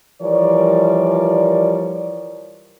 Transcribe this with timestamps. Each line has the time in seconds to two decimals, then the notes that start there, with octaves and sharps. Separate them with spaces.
0.22 E3 F3 G3 A#4 C#5 D5